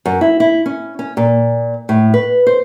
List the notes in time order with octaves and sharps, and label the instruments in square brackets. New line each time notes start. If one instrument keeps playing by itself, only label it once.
[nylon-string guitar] F#2
E4
E4
C#4
C#4
A#2
A2
B4
C5